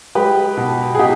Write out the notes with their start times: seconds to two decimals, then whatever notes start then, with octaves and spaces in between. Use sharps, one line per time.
0.15 G#3 G4 B4
0.57 B2
0.95 G#4
0.99 B2 D#4 G4